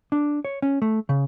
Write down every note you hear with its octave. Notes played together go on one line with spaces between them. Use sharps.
D4
C#5
C#4
A3
C#3